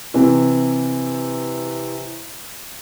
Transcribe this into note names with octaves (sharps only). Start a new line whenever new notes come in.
C3 E3